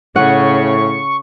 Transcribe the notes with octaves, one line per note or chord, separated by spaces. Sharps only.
A2 C#3 F#5 C#6